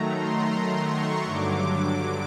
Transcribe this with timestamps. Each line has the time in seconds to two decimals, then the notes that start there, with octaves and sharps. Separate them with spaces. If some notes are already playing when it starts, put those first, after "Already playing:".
Already playing: D#3 F#3 A3 A#5
0.15 C6
0.89 C#6
1.25 G2 D3 F#3 D6
1.63 D6